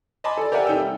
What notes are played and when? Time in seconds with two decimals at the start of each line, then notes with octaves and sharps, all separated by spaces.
0.24 D#5 G#5 A5 B5 C6 D6
0.37 A4 D5
0.52 G4 A#4 D5 E5 F#5 G#5
0.66 C3 D#4 A4 G5 E6
0.78 G3